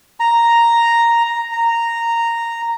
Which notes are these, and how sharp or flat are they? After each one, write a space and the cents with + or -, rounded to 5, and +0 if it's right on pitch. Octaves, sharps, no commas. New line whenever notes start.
A#5 +0
A#5 -10